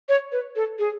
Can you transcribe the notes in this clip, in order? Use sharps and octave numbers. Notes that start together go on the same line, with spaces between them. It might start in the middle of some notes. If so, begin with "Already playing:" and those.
C#5
B4
A4
G#4